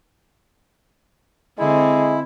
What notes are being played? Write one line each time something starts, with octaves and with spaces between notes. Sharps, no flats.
D3 G#3 C4 E4